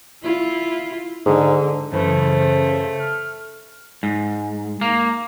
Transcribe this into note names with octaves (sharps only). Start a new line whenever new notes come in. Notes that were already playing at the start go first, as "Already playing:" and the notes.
E4 F4
G#2 D3
F#2 C#3 E3 A3 B4 C5
F6
G#2
A#3